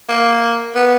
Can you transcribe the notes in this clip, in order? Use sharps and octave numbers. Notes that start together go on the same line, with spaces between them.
A#3
B3